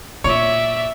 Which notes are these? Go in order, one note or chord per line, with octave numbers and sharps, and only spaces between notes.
A#2 C#5 D5 E5